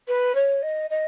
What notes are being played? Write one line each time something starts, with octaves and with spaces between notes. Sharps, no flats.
B4
C#5
D#5
D#5